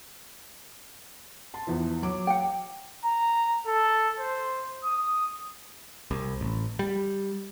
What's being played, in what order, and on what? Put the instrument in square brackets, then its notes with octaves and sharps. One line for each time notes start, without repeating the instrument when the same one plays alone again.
[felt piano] A5 C6
E2 E3 F3
F#3 C#5 D6
[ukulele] F#5 G5
[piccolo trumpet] A#5
A4
C5
D#6
[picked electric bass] C2
A1
G3